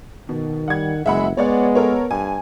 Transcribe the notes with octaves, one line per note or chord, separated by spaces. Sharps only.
B2 D#3
G3 F#5 G#6
F#1 G#3 E5 F#5 B5
G#3 B3 C#5 D5 F#5
A4 A#4 C#5
G2 G#5